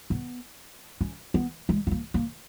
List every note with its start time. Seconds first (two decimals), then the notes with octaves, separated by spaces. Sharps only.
0.10 B3
1.01 C#4
1.34 B3
1.69 G#3
1.87 B3
1.91 A#3
2.14 A#3